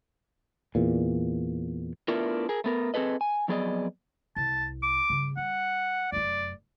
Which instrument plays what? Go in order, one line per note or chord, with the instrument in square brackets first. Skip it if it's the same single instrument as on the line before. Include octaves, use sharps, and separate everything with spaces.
[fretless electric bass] E2 A#2
[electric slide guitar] A3 B3 D4 E4 F4 A#4
G#4 A#4
A3 B3 A#4
C4 G#4 A4 B4 D#5
G#5
F2 F#3 B3 G#4 D5 D#5
[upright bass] C2 [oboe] A5
[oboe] D6
[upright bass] G2 C#3
[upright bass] G3 [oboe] F#5
[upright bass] F1 F#2 [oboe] D5